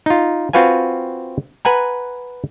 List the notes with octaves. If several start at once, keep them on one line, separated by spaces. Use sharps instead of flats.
D#4 F4
C4 F4 F#4 B4 F5 G#5
B4 F#5 G#5 A#5